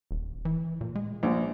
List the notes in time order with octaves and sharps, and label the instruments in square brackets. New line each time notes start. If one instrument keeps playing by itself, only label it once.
[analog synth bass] D#1
E3
A#2
G#3
[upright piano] A#1